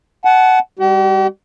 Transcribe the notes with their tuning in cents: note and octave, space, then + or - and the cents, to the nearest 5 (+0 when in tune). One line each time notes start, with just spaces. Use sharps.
F#5 +10 A5 -30
G3 +20 G4 -45